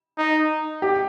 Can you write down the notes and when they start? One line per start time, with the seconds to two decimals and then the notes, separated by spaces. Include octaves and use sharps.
0.18 D#4
0.82 G4